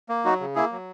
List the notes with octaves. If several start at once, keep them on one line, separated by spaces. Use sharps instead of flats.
A#3
F#3 D#4 F#4
C#3
A#3 E4 G#4
F#3